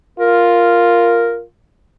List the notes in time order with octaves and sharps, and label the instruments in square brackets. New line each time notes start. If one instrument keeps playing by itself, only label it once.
[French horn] F4 [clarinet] A#4